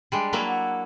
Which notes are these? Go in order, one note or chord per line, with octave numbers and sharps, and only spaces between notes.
G3 G#3 D4
F#3 A#3 E4
F#5